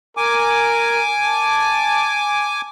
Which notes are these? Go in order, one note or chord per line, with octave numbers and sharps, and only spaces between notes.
A#4 G#5 D6
A5